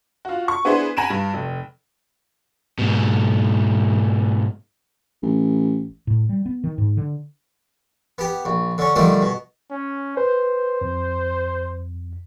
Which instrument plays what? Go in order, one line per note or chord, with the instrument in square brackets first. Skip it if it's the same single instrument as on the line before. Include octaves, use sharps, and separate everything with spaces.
[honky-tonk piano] F4 F#4
C#6
B3 D4 E4 G#4 B4 C5
F#5 G#5 A#5 B5 D7 E7
G2
F1
[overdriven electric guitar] G#2 B2
[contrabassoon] A1
[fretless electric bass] A2
G3
B3
D#3
G#2
D3
[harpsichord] B3 G4
A#1
D3 C#4
D3 D#3 F3 G3 A3
B2
[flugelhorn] C#4
[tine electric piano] B4 [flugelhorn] C5
[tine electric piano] F2